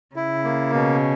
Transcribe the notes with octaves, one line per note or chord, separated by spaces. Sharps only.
C#3 E4
A#3
B2